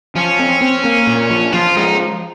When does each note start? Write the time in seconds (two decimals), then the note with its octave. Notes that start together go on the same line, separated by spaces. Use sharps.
0.15 F3 C#4
0.39 C4
0.62 C4
0.85 A#3
1.07 A#2
1.30 F3
1.53 F3 F4
1.77 G#3 D#4